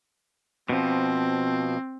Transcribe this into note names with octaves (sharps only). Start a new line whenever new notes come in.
B2 F3 C4